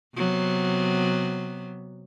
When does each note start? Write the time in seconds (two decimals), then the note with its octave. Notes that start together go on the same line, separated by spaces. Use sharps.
0.15 C3 F#3 B3